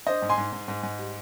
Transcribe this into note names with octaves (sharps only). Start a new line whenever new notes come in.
D4 C5 D#5
G#2
G#5 C6
G#2
G#2
G#2
G#2
G3